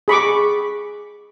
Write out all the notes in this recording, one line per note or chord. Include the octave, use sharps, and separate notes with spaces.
G#4 B5 C#6 D6